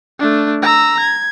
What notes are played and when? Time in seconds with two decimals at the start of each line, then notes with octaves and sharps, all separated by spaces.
0.19 A3 D4
0.62 A#5 E6
1.00 G#6